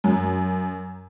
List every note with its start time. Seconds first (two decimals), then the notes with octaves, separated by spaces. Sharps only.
0.04 F#2